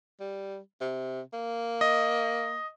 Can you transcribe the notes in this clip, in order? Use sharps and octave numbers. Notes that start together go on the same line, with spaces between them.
G3
C3
A#3
D#5